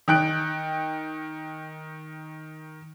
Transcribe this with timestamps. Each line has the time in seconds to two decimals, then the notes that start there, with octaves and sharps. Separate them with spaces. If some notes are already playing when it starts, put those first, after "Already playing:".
0.08 D#3 G5 F#6 D7